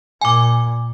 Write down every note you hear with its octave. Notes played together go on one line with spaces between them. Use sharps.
A#2 G#5 D6